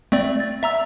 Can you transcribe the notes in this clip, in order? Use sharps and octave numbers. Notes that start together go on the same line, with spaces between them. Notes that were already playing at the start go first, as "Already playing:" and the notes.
A3 C4 D5
A6
E5 A#5 E6